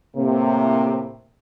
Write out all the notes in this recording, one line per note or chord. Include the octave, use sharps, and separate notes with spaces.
A2 C3 A#3